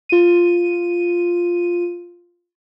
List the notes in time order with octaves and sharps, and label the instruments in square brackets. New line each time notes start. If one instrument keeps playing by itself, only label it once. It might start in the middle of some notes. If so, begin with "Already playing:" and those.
[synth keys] F4 D#7